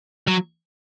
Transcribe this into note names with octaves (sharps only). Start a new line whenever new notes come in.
F#3